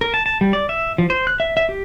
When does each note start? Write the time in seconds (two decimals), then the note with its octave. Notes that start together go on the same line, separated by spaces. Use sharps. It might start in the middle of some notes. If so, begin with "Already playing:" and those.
0.01 A#4
0.14 A5
0.26 A5
0.41 G3
0.53 D5
0.69 E5
0.98 F3
1.10 C5
1.27 F#6
1.40 E5
1.57 E5
1.69 G4